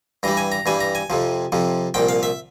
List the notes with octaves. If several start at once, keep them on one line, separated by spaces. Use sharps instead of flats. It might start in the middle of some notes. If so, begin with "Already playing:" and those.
G2 E3 G3 A#5
G#5
A#5
G2 E3 G3 G#5
A#5
G#5
F2 C3 F3
F2 C3 F3
C2 A#2 F3 G5
F5
E5